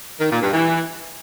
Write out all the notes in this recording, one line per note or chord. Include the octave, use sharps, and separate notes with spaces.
D#3
A#2
G2
E3